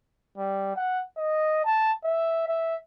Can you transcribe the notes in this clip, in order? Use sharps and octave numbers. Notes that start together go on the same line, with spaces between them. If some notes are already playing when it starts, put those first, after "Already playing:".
G3
F#5
D#5
A5
E5
E5